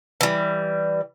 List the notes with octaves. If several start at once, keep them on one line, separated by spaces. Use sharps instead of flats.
E3 G3